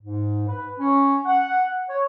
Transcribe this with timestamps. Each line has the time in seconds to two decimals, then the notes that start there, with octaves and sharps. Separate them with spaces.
0.01 G#2
0.47 B4
0.78 C#4
1.25 F#5
1.89 C#5